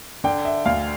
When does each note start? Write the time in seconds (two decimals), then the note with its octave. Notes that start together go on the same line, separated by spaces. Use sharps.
0.24 D3 G5
0.45 E5
0.65 D2 F5